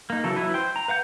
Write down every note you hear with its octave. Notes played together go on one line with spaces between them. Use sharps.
A#3 D#4
C#3 E3 F#3 A4
F#3 E4 B4
C5 G5
A#5
B4 F5 F#5 G6